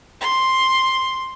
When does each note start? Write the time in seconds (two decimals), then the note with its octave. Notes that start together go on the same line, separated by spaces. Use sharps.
0.21 C6